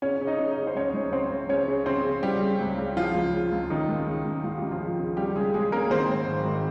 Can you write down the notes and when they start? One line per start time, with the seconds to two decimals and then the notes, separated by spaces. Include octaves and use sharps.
0.02 C#3 C#4 C#5
0.21 C#3
0.27 D#4 D#5
0.39 C#3
0.51 D#4 D#5
0.58 C#3
0.67 C5
0.76 C#2 C#4 C#5
0.94 C#2
1.12 C#2 C4 C5
1.31 C#2
1.49 C#3 C#4 C#5
1.68 C#3
1.86 C#3 C4 C5
2.05 C#3
2.23 C#3 G3 G4
2.42 C#3
2.60 C#2
2.78 C#3
2.96 C#3 F3 F4
3.15 C#2
3.33 C#3
3.52 C#2
3.70 C#2 D#3 D#4
3.89 C#2
4.07 C#3
4.25 C#2
4.44 C#2 F4
4.57 C#2 G4
4.71 F3 F4
4.81 C#3
4.99 C#3
5.17 C#3 G3 G4
5.36 C#3 G#3 G#4
5.54 C#3 G#3 G#4
5.72 C#3 A#3 A#4
5.91 D#3 C4 C5
6.10 G#2
6.27 G#1
6.46 D#3